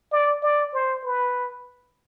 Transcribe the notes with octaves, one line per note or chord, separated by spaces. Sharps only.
D5
D5
C5
B4